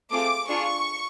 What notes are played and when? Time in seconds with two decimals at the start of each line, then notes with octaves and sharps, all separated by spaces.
0.11 A3 C4 F4 G#4 D6
0.49 D4 F4 G#4 C#6